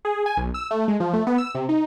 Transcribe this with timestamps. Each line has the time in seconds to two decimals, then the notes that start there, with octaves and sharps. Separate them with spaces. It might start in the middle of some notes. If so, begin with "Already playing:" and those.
0.05 G#4
0.26 G#5
0.37 B1
0.54 E6
0.71 A3
0.88 G#3
1.00 F3
1.13 A3
1.27 B3
1.38 E6
1.55 C3
1.69 D#4